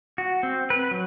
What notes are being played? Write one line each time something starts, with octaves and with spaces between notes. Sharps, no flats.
F#4
C4
B4
F#3